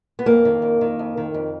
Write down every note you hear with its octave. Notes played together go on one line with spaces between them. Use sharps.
B3
F2 A#3
D#3
F2
D#3
F2
D#3
F2